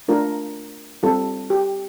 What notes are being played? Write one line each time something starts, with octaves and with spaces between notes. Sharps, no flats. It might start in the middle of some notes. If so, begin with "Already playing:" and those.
A3 D4 F4 A#4
G3 C4 F4 A4
G4